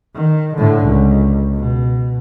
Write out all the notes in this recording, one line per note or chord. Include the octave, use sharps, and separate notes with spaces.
D#3
A2 D3
C#2
B2